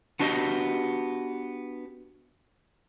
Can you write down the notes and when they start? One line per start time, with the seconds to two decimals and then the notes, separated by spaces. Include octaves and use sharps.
0.20 B3 D4 F#4 G4 D#5